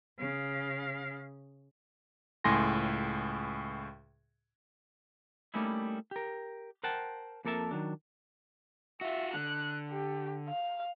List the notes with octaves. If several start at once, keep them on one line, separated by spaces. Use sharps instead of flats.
C#3 F5
C#2 A2 G#5 C6 A#6
G3 A3 A#3 C#4 D#4 E4
G4 A#4
A#4 C5 F#5 G5 A5
F2 A#3 A4 A#4 E5 A5
D#3 E3 F#3 D4
F4 F#4 E5
D3 F#6
G4
F5